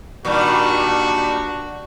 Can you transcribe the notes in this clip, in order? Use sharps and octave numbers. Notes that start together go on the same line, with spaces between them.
A#2 D#3 G3 D4 F#4